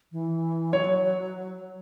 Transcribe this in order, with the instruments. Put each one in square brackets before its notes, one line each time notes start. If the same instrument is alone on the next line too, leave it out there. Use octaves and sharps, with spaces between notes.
[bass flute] E3
[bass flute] F#3 [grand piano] C#5